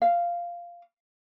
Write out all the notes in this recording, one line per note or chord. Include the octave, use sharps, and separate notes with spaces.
F5